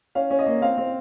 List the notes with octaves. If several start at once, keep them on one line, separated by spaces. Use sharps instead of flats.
C#4 F5
C#4
D#5
A#3
C4 F5
C4